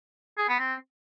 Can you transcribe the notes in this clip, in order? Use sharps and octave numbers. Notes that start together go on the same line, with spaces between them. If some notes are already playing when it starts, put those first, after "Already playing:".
G#4
B3
C4